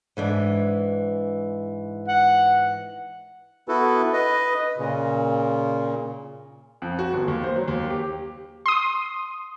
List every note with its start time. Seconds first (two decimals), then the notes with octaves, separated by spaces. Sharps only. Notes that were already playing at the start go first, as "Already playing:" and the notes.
0.17 G#2 E3 D4
2.08 F#5
3.68 B3 E4 F#4 A4 B4
4.13 B4 D#5
4.78 A#2 C#3
6.82 F2
6.99 F#4
7.13 G1
7.28 D#2
7.44 C5
7.56 F#3
7.68 D#2
7.90 G4
8.66 C6 D#6